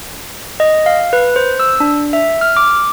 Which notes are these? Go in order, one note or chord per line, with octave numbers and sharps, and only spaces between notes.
D#5
F5
B4
C5
E6
D4
E5
F6
D6